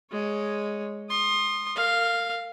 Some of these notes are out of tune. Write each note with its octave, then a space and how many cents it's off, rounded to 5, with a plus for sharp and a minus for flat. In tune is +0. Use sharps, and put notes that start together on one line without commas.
G#3 +0 C#5 +0
C6 +20 D#6 -20
A#4 -35 F5 +0